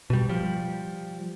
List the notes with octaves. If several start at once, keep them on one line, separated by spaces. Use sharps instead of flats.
B2 G3
F3 G3